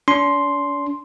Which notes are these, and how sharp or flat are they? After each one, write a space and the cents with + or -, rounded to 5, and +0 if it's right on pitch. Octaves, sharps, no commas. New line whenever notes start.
D4 -45 C6 +0